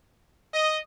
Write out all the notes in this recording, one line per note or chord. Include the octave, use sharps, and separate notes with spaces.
D#5